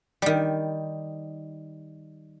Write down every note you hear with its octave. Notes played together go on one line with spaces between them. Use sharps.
D#3 G3